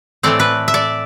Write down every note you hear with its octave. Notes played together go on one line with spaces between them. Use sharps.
A2 E3 A3 C4 D5
B4
E5
D5